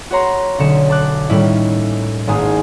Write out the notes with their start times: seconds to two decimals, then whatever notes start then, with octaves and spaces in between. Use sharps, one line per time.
0.10 F#4 B4 C#5 A#5 C6
0.59 B1 D3 C#4 C#7 E7
0.89 A5 D6 F#6
1.29 A2 D#3 G3 A#3 C#4 E4
2.27 G#1 G#2 A#3 G#5 D#6 G#6